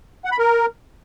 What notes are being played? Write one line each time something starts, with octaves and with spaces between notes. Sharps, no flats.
F#5
B5
A#4